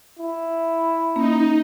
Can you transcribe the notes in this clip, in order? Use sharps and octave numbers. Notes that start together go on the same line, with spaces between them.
E4
A#3 C#4 D#4